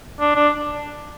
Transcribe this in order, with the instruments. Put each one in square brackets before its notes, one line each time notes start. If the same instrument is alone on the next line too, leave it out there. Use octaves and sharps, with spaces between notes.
[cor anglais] D4
D4